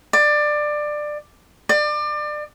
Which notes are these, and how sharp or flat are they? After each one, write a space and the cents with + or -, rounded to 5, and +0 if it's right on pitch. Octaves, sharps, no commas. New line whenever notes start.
D5 +20
D5 +30